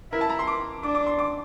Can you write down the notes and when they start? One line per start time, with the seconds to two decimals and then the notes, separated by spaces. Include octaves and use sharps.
0.12 E4 A#4
0.21 A5
0.30 A#5
0.39 C6
0.47 D6
0.83 D4 D6
0.95 D6
1.07 C6
1.19 D6